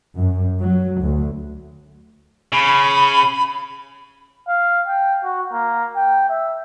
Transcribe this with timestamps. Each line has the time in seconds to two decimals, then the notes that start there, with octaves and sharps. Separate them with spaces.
0.15 F#2
0.60 F#3
1.00 D2
2.53 C#3 B5
4.48 F5
4.87 G5
5.24 F#4
5.53 A#3
5.96 G5
6.29 E5